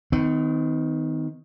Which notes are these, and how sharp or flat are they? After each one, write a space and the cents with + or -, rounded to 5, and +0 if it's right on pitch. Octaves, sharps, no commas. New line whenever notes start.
D#3 +15 C4 -45